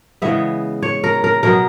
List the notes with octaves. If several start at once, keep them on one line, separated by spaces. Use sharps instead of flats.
C#3 E3 G#3 B3 E5
C#5
A#4
A#4
B2 F#3 B3 A#4